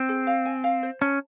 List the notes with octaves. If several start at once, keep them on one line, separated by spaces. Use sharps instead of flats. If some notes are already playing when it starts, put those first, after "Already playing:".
Already playing: C4
G#4
F5
G#5
F5
C5
C#4 A5